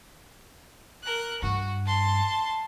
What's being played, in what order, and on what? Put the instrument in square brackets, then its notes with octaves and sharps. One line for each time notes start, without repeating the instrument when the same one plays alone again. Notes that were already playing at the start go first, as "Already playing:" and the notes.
[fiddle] A#4 F#6
[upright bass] G2 [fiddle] F#4
[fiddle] A5 C6